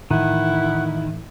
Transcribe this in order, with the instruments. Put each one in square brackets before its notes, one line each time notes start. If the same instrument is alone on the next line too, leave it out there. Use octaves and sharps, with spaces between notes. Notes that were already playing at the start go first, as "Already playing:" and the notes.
[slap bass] A2 E3 [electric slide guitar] D#3 [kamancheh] E4 [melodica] F#5